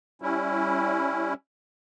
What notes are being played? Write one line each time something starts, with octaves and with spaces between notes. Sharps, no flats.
G3 C#4 E4